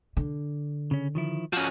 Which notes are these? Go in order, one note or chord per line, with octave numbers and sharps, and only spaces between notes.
D3
C#3 C#4
D#3 F3 E4
F3 C#4 F#4